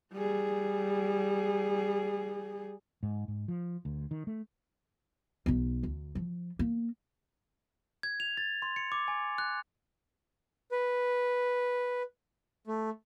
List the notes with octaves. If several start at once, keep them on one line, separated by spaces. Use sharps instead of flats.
G3 G#4
G#2
G#2
F3
D2
D#3
A3
B1 D#4
D2
F3
A#3
G#6
F7
A6
C6
C#7
D6
G#5
F#6
B4
A3